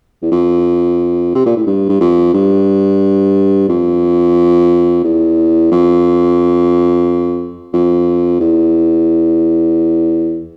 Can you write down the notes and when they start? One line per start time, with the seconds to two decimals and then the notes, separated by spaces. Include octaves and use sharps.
0.22 E2
0.32 F2
1.35 C3
1.46 A#2
1.56 A2
1.67 G2
1.89 G2
2.01 F2
2.34 G2
3.69 F2
5.04 E2
5.71 F2
7.73 F2
8.40 E2